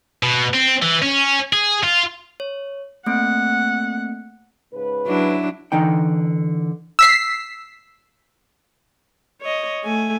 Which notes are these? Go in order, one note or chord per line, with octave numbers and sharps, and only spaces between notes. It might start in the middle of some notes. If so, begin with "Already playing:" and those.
B2
C4
E3
C#4
G#4
F4
C#5
A3 A#3 C4 F#5
G#2 C#3 B4
F#3 D4 E4
D3 E3 D#4 G5
E6 B6 C7
C#5 D#5
A3 G#5